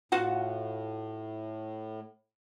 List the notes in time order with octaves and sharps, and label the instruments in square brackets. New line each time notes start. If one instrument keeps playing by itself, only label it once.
[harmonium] A2 [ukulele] F4 F#4 F#5